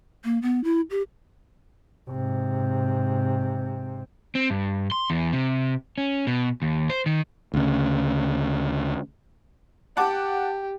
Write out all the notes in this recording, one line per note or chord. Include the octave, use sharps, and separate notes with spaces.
A#3
B3
E4
G4
G#2 C3
C4
G2
C6
E2
C3
C#4
B2
D#2
C5
D#3
D2 C#3
G4 F#5 A5 D6